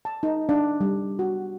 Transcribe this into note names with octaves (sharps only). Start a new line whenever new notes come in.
A5
D#4
D4
G3
F#4